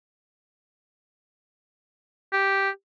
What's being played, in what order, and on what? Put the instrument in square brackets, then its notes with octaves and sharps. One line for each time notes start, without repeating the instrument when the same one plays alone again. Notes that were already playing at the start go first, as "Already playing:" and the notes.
[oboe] G4